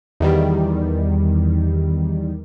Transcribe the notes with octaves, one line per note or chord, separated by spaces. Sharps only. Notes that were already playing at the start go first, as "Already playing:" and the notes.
E2 D#3 G3